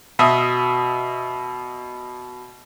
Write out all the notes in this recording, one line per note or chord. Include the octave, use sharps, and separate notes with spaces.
B2 E5 D#6